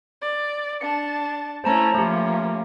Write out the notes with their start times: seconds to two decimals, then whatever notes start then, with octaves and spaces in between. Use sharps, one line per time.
0.21 D5
0.81 D4 A5 C#7
1.64 A3 C#4 E4 C5 A5 A#5
1.95 F3 A3 A#3 C#4 G4